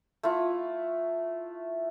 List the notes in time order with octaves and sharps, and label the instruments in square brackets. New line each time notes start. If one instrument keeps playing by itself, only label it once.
[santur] A3 E4 F4